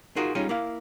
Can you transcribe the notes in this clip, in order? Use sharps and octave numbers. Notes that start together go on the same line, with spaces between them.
D#4 F4 F#4 G#4 A#4
G3 C#4 D#4 F4 G#4
A#3 E4 F5